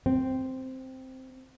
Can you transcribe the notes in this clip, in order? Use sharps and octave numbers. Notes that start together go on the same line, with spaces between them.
C4